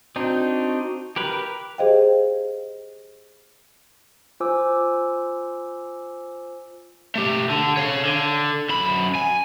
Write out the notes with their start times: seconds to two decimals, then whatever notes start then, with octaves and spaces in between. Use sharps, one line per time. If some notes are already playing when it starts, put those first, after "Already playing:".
0.16 C4 D4 D#4 F#4
1.16 G4 A#4 B4
1.78 G4 G#4 C5 D#5 F5 G5
4.40 F4 C5 G#5 D6 E6
7.15 A3 G4
7.50 D3
7.77 C#5 F5
8.05 D3
8.69 F#2 B5
9.15 G#5